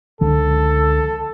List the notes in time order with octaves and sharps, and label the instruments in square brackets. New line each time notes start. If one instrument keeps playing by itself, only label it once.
[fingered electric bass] C#2 D3 F3 [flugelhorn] A4